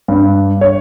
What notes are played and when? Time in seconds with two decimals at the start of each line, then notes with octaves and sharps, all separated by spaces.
0.08 G2
0.61 C#5